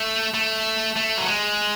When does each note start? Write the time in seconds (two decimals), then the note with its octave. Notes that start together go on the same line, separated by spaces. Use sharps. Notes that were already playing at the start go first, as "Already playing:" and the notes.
Already playing: A3
0.34 A3
0.96 A3
1.17 F#3
1.27 G#3